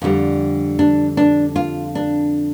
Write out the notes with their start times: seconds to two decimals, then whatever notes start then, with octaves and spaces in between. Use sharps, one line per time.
0.02 F2 D3 G3
0.79 D4
1.17 D4
1.56 F4
1.95 D4